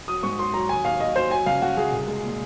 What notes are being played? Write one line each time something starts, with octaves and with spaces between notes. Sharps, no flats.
F#3 D#6
G#2 C#6
F#3 C6
F#3 A#5
D#2 G#5
D#2 F5
D#2 D#5
F#3 C5
F#3 G#5
C#2 F5
C#2 F#4
C#2 G#4
C2
G#3
A#2